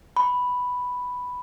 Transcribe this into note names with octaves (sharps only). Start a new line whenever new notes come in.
B5